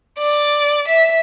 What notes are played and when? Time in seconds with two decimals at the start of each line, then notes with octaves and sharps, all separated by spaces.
0.19 D5
0.88 E5